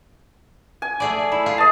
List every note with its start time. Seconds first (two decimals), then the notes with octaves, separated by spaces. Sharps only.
0.82 G#5
1.00 A3 G#4 D5
1.32 E4
1.46 F4 G#4
1.58 D#5 A5